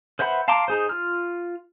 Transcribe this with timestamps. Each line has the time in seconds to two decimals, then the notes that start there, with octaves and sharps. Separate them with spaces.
0.19 B4 C5 E5 F#5 B5
0.48 F5 A5 A#5 C6 D6
0.68 D#4 G#4 C5
0.89 F4 F6